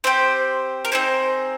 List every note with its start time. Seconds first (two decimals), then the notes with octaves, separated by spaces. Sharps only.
0.04 C4 G4 C5
0.85 A#4
0.92 C4 D#4 G#4 C5